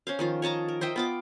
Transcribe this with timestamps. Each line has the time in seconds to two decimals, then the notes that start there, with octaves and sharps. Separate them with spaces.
0.07 C#4 C5 F5
0.19 D#3 F3 F4
0.42 C#5 D#5 A5 A#5
0.68 A#4
0.81 C5 D#5 E5 G5
0.96 B3 F4 D6